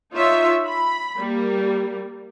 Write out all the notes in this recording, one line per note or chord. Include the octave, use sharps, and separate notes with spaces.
D#4 F4 C#5 E5
B5
G3 A#3